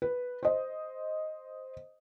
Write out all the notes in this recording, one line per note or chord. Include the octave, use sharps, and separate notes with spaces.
B4
C5 D#5